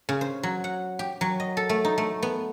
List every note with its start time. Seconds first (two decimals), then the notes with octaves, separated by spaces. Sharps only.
0.09 C#3
0.21 C5
0.43 F#3
0.64 F#5
0.99 G4
1.21 F#3
1.40 D#5
1.57 A4
1.69 A3
1.85 D#4
1.98 A3
2.23 B3